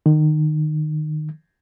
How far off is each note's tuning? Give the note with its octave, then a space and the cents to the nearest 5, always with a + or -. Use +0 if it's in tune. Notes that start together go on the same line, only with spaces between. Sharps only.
D#3 -25